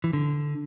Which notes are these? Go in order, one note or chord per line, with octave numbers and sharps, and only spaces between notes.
E3
D3